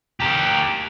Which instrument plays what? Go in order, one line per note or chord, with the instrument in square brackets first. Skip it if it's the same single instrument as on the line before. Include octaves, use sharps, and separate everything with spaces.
[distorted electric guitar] G4 A#4